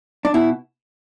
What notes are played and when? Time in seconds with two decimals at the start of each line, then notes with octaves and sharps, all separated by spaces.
0.25 D4
0.34 B2 E4